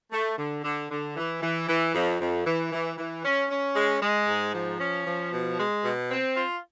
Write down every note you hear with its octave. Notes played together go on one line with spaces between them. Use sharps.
A3
D3
D3
D3
E3
E3
E3
F2
F2
E3
E3
E3
C#4
C#4
G#3
G#3
G#2
F3
C#4
F3
B2
G#3
B2
C4
F4